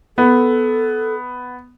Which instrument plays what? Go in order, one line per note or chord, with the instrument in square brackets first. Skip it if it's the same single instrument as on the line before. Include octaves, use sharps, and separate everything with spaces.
[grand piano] B3 [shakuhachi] A4